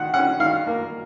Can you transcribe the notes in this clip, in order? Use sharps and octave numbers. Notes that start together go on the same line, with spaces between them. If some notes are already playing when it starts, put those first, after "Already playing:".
Already playing: D#3 F#5
C#4 F#5
D#3 F5
A#3